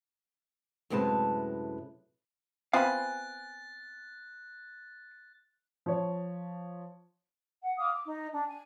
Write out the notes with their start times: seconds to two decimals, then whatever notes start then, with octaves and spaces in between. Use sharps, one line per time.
0.90 F#2 A2 C3 G#3 B4 A5
2.73 B3 C4 F4 F5 G#5 B5 F#6 A6
5.86 F3 C#5
7.62 F#5
7.78 F5 D6 D#6
7.92 D6
8.05 D#4
8.30 D4
8.46 G#5